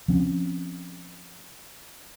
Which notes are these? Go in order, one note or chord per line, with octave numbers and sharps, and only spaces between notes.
F3 C4 C#4